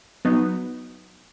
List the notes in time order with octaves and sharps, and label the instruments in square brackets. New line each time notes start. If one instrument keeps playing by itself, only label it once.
[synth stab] F#3 B3 D#4